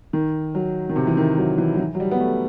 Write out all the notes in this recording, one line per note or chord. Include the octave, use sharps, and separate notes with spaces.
D#3
F#3
D#3
C3
E3
D#3
F#3
E3
F#3
E3
F#3
G3
B3
A3